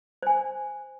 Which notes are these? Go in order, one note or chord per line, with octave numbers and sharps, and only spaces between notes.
C5 G#5